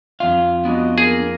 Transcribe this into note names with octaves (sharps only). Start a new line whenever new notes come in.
F2 F4 F5
B3 D4 F#4 D#5
A#3 G#4 A#4